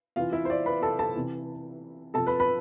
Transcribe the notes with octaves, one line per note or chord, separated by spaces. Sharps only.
C3 E3 F4 F5
E4 E5
C5
D5
B4 B5
A4 A5
A4 A5
C3 E3
C3 F3 A4 A5
B4 B5
B4 B5